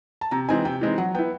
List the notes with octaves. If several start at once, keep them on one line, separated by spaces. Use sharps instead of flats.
A5
C3 A#5
E3 G#3 C4 D#4 G#5
C3 G5
E3 G#3 C4 D#4
F#3 F#5
B3 E4 G5